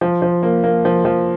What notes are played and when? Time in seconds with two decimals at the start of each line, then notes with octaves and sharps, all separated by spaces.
0.01 F3
0.22 F3
0.43 A#3
0.64 A#3
0.85 F3
1.05 F3